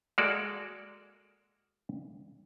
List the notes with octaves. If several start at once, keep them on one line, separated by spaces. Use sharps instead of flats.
G#3 A#3 F#4 A4 D5